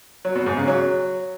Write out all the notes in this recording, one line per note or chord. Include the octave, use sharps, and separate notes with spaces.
F#3
B2
G#2
C#3
F#3